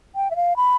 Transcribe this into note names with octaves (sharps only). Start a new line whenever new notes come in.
G5
E5
F5
B5